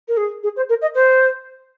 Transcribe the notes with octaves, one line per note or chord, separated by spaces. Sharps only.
A#4
G#4
G#4
C5
A#4
D#5
C5